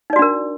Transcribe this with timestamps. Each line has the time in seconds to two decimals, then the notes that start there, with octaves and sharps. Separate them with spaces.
0.10 D#4
0.13 D5
0.16 F#4
0.19 D4
0.22 A#4